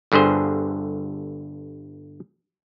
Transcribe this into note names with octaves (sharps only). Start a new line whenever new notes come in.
G1 G2 D3 G#4 C5